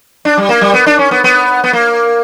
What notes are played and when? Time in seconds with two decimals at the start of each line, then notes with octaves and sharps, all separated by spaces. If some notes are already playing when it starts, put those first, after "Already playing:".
0.25 D4
0.37 G3
0.49 A#3
0.61 G3
0.74 B3
0.86 D4
0.99 C#4
1.11 B3
1.24 B3
1.64 B3
1.73 A#3